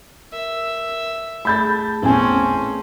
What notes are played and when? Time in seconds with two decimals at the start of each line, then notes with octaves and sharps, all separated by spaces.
0.32 A#4 E5
1.45 A3 G#4 A5 B5 G6 A6
2.02 A1 E2 C4 C#4 G#5